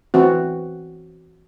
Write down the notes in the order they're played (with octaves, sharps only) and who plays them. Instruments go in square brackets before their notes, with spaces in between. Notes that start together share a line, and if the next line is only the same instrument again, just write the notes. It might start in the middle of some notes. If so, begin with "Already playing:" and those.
[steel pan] E3 C4 F#4